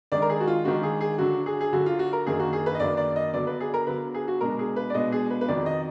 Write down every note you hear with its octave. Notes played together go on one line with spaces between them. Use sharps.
D#3 G#3 D4 D5
A#4
G#4
F#4
F4
D#3 G#3 D4 F#4
G#4
G#4
D3 F#3 D4 F#4
G#4
G#4
D3 F#3 D4 F#4
F4
F#4
A#4
F#2 D#3 A#3 D4 G#4
F#4
G#4
B4
D#5
F#2 D#3 A#3 D4 D5
D5
D#5
D3 F#3 B3 D4 D5
B4
G#4
A#4
D3 F#3 B3 D4 B4
G#4
F#4
B2 G#3 D4 A#4
G#4
B4
D5
B2 G#3 D4 D#5
G#4
B4
B4
F2 D#3 F#3 D5
D#5